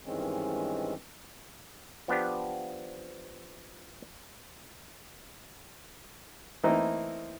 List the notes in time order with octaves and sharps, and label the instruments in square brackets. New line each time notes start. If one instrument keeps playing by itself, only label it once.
[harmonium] G2 D#3 E3 G#3 C4 C#4
[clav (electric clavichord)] F3 B3 D4 G4
[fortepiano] E3 A3 A#3 C4 D#4 E4